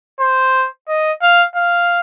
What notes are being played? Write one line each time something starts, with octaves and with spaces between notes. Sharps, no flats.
C5
D#5
F5
F5